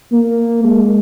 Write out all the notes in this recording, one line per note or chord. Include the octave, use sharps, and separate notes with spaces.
A#3
G#3